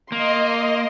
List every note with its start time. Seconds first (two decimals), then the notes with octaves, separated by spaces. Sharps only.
0.12 A#3 D#5 C6